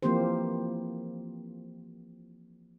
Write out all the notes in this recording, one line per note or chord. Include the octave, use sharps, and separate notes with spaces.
E3 F3 A#3 C4 G4 C5